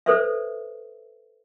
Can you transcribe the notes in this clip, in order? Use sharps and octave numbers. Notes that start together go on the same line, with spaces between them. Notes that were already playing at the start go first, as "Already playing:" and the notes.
A4 B4 C5 D5 E5